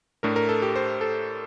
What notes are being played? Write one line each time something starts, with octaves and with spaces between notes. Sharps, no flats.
A2 A3 D4 A#4
A#4
A4
G4
C5
A4